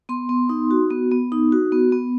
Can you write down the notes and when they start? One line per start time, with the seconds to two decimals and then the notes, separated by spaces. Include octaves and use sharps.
0.09 B3 C6
0.29 B3
0.49 D#4
0.71 F#4
0.90 B3
1.11 B3
1.32 D#4
1.52 F#4
1.72 B3
1.92 B3